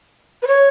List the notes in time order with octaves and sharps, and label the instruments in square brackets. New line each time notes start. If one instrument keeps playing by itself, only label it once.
[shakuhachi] B4
C#5